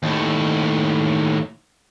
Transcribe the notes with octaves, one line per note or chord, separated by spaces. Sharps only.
D#2 A2